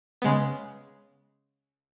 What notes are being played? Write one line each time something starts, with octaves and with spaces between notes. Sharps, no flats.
C#3 G#3 B3